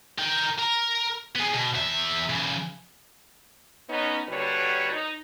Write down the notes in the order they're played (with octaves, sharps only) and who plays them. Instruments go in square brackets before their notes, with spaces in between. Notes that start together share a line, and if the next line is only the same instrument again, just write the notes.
[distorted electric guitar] A#4 G5
A#4
B3 G#4
B2
E2 E5
C#3 E3
[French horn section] B3 C#4 D#4
D#2 D3 G3 F#4 B4 C#5
D#4